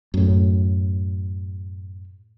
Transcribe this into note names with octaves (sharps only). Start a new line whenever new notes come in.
F#2 A2